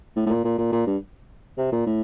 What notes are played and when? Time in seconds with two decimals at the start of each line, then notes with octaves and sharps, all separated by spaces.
0.16 A2
0.26 A2
0.30 A#2
0.44 A#2
0.58 A#2
0.72 A#2
0.87 G2
1.58 C3
1.72 A#2
1.87 A2